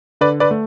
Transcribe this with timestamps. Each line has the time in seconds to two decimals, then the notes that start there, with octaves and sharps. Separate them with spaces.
0.21 D3 B4 D5
0.40 B4 D5
0.51 A3